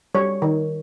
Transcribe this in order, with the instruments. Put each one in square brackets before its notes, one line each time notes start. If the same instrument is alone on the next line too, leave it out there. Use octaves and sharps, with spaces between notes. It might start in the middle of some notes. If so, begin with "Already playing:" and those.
[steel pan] G3 C#5
D#3